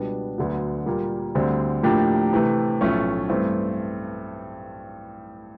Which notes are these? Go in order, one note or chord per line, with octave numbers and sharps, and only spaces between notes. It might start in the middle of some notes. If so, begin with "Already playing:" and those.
Already playing: C#2 B2 G3 B3 D4
D2 D3 F#3 B3
A#2 G3 A#3
D2 D3 G3 C4
A2 F3 A#3 D4 G4
C3 E3 A3
B1 A2 F3 A3 C#4
G2 E3 A3 C4